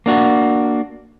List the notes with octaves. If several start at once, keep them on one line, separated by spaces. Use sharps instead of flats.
A#3 D4 F#4